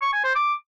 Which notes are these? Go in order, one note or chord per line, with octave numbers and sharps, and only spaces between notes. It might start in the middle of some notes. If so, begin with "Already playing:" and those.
C#6
G#5
C5
D6